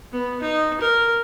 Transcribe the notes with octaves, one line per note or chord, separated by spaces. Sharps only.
B3
D#4
A#4